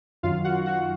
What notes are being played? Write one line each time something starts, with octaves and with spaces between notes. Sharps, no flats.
F#2 D#3 F#3 F4 F5
F#4 F#5
F#4 F#5